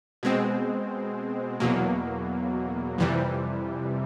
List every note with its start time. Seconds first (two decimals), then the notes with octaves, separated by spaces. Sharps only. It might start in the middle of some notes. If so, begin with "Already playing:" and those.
0.23 B2 G#3 C4
1.60 E2 B2 F#3 A#3
2.98 F2 C3 E3 G3